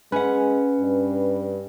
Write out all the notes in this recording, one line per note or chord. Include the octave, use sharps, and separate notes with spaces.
G#3 C#4 B4 F#5
G2